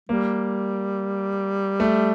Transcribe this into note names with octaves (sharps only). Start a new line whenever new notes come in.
G3 A#3
A3